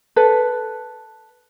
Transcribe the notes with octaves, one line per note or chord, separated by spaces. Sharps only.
A4 B4